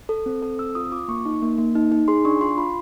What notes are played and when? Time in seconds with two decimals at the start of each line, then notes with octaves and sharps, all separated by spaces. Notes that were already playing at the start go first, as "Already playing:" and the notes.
0.09 A4
0.26 C4
0.43 A4
0.59 C4 E6
0.75 F4 D#6
0.92 F4 D6
1.08 A#3 C#6
1.26 D#4
1.42 A#3
1.58 A#3
1.75 D#4
1.92 D#4
2.08 G#4 C6
2.25 D4 C#6
2.41 F4 C6
2.58 F4 B5